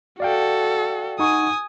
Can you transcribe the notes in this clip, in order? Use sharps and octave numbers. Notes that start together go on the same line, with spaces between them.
F#4 A4 D5 F5 G5
D#4 F#5 G#5 C#6 D#6